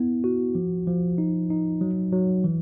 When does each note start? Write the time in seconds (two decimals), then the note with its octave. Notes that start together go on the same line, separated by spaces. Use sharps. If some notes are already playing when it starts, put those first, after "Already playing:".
Already playing: B3 E4
0.24 F#4
0.55 F3
0.87 F3
1.18 D#4
1.50 D#4
1.81 F#3
2.13 F#3
2.44 E3